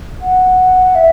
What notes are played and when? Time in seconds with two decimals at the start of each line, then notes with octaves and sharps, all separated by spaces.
0.21 F#5
0.95 E5